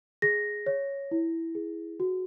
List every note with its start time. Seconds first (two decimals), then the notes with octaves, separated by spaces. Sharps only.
0.22 G#4 A#6
0.66 C#5
1.11 E4
1.55 G#4
2.00 F#4